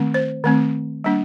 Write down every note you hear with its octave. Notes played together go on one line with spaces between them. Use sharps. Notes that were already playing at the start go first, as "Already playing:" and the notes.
Already playing: D#3 A3 C4
C5
D#3 A3 C4
G3 A#3 D4